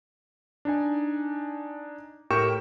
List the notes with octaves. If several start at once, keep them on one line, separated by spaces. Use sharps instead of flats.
D4 D#4 G#5
A2 G4 A#4 G5 C#6 E7